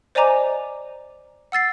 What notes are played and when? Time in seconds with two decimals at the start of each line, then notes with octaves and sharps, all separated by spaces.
0.15 C5 D5 D#5 G#5 A#5 D6
1.52 F#5 E6 A6 C7